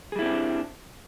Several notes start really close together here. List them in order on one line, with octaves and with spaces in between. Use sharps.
G#4 G3 E4 C4 D4